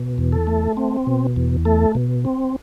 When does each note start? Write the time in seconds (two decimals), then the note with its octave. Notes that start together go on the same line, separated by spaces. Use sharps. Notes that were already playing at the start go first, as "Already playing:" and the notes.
Already playing: B2
0.18 E2
0.32 A4
0.47 A3
0.77 C4
1.07 B2
1.36 E2
1.65 A3 A4
1.95 B2
2.25 C4